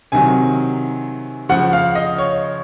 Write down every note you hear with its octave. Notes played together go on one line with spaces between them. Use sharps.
C3 D#3 F#3 G#5
C#3 F3 F#5
F5
D#5
C#5